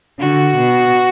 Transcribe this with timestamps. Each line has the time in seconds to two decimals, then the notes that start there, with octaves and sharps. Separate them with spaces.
0.19 D3 F#4
0.57 B2